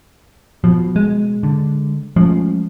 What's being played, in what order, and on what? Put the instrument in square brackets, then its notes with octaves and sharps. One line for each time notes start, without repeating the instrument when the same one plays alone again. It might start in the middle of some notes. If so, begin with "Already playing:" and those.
[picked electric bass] B2 [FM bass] F3
[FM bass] G#3
[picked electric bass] D3
[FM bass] F3 [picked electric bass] G#3 A3 C#4